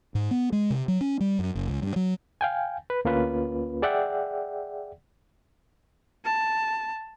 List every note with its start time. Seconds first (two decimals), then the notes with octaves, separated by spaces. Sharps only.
0.15 G#2
0.31 B3
0.52 G#3
0.70 C3
0.88 F#3
1.01 C#4
1.20 G3
1.39 F#2
1.55 F#1
1.68 C#2
1.82 G2
1.96 F#3
2.41 F5 G5 G#5
2.90 B4
3.05 D2 A#3 C#4 F4 B4
3.82 G#4 D5 E5 F#5 G5
6.25 A5